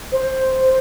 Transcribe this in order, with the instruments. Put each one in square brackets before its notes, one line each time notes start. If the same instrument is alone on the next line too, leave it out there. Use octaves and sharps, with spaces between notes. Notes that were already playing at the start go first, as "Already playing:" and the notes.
[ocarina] C5